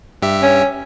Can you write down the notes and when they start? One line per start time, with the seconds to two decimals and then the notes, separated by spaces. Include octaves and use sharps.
0.22 G2 G4 E5
0.42 C#4